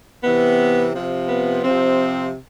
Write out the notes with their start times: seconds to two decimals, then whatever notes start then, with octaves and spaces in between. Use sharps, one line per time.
0.22 C3 E3 B3
0.94 C3 F3
1.28 B3
1.63 C3 F3 C4